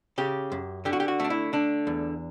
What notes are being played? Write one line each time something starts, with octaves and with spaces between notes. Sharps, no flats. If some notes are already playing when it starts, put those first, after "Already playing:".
C#3 G4
F#2
D3 G4
F#4
G4
F#4
A3 D4
E4
D3 D4
E2